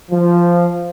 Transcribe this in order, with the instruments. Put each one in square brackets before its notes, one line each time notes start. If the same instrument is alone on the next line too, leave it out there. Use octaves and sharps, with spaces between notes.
[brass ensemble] F3